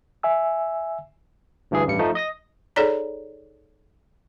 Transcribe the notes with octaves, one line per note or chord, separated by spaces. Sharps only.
E5 G#5 E6
D2 G2 E3 G#4
A1 G2 C#7
F3 A3 D#4
D#5 D#6 A#6
D#4 G#4 A4 C#5 D5 A#5